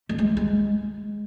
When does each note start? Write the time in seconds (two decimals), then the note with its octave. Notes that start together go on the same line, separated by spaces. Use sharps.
0.09 A3
0.18 G#3
0.37 G#3